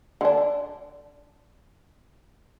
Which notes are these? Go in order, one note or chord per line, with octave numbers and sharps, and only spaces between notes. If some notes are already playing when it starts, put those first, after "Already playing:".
D3 D4